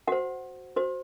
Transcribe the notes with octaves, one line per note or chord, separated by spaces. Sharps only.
F#4 C5 F#5
F#4 C5